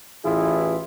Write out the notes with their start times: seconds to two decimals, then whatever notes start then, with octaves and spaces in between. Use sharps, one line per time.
0.24 A1 E3 E4 F4 G#4